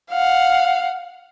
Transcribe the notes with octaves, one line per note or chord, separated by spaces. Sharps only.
F5 F#5